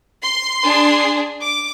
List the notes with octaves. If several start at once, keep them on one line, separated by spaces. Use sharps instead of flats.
C6
D4 G#4
D6